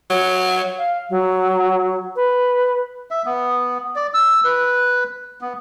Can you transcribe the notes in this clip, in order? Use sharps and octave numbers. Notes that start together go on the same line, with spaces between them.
F#3
F5
F#3
B4
E5
B3
D5
E6
B4
B3